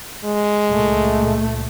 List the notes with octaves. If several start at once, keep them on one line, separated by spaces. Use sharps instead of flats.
G#3
C#2 A#2 A3